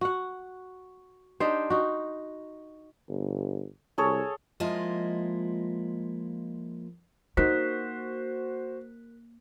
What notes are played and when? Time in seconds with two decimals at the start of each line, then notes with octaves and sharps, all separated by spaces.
0.01 F#4 F#5
1.40 D4 D#4 G4 C5
1.70 D#4 F#4
3.09 G1
3.98 C2 G#4 A4 C#5
4.60 F3 G#3 A#3 E4 F4 D#5
7.37 A#3 D#4 F#4 A#4 C5 F#6 B6